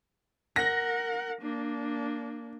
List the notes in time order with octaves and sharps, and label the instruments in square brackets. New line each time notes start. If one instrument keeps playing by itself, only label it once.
[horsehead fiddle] A#4 F#5 [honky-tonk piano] A#6
[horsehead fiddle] A#3 D4